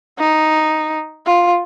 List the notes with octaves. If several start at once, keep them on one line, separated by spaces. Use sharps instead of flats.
D#4
F4